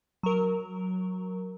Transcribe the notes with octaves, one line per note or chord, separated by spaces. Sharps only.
F#3 A#4